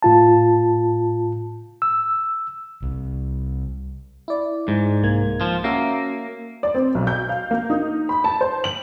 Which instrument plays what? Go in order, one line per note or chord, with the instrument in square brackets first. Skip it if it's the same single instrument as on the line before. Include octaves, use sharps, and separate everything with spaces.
[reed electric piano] A2 F4 A5
E6
[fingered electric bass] C2
[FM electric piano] E4 D5
[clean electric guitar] G#2
[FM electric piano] C2 A#3 G#6
[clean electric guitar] F3
[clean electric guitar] A#3 [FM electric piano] C#4 F#4 E5
[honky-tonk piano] D5
C4
B1
G6
F5
A#3
D#4
B5
A5
C5
F#7